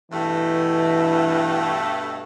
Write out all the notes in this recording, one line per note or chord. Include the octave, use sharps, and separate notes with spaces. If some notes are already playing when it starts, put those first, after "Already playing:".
G2 B2 E3 A3